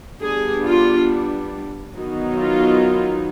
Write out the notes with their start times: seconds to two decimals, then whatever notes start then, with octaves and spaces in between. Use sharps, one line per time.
0.22 G3 B3 D4 G#4
0.66 F4
1.95 D#3 F#3 B3 D#4
2.38 F4